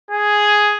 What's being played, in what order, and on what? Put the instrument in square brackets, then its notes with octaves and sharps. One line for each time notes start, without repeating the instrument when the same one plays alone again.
[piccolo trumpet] G#4